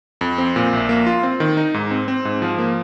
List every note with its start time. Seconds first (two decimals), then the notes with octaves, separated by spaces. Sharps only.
0.21 F2
0.38 C4
0.56 A#2
0.73 A#1
0.89 A#3
1.06 F4
1.23 C4
1.40 D#3
1.57 D#4
1.74 G#2
1.91 C4
2.08 C4
2.25 G#2
2.42 F3
2.59 A#3